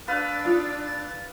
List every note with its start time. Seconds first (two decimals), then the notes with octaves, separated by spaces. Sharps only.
0.08 D4 B4 F5 E6 F#6 A6
0.45 D#4 F4